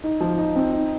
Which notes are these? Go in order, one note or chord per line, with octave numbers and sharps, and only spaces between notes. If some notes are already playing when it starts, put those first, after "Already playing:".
D#4
F3
D#4
C4
D#4